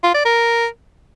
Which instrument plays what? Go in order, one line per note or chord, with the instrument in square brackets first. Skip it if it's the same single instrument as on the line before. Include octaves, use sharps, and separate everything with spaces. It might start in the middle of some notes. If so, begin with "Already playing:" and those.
[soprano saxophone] F4
D5
A#4